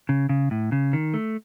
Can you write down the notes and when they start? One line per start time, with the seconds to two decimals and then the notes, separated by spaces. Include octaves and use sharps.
0.09 C#3
0.29 C#3
0.51 A2
0.72 C#3
0.93 D#3
1.14 A3